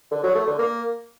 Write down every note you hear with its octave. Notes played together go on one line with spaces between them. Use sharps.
D3
F#3
A3
D3
A#3